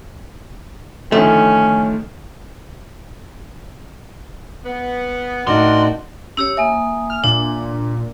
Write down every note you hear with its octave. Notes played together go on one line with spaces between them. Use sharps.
D3 D#3 F3 A3 C#4
B3
A2 D4 D#4 F#4 A#4 D5 C6
C#4 G4 C#5 E6
A#3 E5 G#5 D#6
F6
A#2 D4